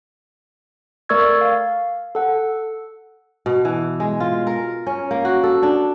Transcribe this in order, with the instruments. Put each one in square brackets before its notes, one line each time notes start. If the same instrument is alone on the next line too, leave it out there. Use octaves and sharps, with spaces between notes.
[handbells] A3 A#4 D5 C#6 E6 G#6
F5
A4 F#5
[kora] B2
E3
G#3
F4
A#4
C#4
A#3
F#4
A4
D4